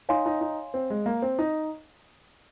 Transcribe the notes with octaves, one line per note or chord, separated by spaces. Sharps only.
D#4 C#5 F5 G#5 C6
D#4
D#4
C4
G#3
A#3
C4
D#4